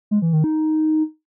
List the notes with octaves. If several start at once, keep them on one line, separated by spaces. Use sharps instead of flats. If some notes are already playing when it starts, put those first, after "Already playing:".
G#3
E3
D#3
D#4